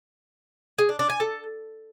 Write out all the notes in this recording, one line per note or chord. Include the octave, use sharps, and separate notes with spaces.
G#4
D4
D4
G#5
A4